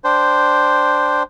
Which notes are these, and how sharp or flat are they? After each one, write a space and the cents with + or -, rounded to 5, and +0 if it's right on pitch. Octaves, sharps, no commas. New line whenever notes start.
D4 +0 C5 -5 G5 +5